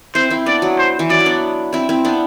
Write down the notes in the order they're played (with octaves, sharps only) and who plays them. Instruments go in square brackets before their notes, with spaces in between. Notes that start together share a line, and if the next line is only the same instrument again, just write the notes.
[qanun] C4 E4 [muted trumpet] C5
[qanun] C4 E4
[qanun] B3 D4 [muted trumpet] D5
[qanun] F#3
[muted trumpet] C5
[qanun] E3
[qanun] F#3 [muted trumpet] D5
[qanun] E4
B3 D4
C4 E4
C4 E4
B3 D4